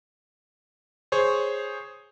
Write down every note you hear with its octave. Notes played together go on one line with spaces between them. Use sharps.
G#4 C5 C#5